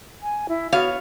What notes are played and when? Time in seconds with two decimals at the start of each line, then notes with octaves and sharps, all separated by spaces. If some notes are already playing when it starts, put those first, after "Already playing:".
0.22 G#5
0.49 E4
0.72 B3 F#4 C#5 F5